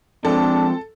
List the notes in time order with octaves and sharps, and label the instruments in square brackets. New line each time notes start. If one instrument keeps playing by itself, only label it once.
[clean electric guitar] F3 G#3 [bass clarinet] C4 [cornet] D4 [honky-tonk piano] A4